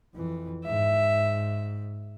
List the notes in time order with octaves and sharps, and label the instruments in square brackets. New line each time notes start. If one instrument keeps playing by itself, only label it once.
[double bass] F2 E3
[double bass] G#2 [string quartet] E5